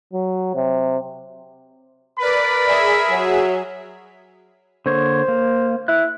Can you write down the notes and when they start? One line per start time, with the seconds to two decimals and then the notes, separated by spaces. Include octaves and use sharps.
0.13 F#3
0.55 C3
2.19 A#4 B4 D5 B5
2.67 G#4 D5 E5
3.09 F#3 F#4
4.86 D3 A#3 C5 C#5
5.28 A#3
5.88 E4 F#6